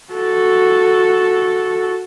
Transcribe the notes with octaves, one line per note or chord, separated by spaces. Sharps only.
F#4 A4